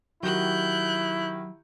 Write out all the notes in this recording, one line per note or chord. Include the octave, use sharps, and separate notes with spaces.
D#3 F#3 E4 F#4 G4 F#6 G6